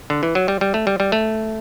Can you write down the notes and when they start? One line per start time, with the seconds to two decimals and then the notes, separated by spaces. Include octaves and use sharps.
0.10 D3
0.23 E3
0.35 F#3
0.48 G3
0.61 G3
0.74 A3
0.87 G3
1.00 G3
1.12 A3